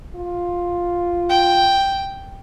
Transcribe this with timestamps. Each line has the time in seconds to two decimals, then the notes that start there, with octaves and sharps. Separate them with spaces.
0.16 F4
1.29 G5